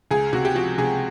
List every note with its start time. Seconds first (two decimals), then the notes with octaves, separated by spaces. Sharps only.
0.11 C#2 G#4
0.33 C3 F#4
0.45 G4
0.55 F3 F#4
0.78 C3 G#4